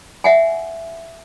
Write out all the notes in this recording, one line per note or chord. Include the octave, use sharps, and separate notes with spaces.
E5 F#5 G#5